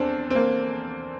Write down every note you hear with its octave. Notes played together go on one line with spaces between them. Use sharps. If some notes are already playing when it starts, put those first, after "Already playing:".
Already playing: E2 C4 D4 A4
C4
A#3